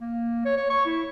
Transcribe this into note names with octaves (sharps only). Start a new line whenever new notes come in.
A#3
C#5
C#5
C#6
E4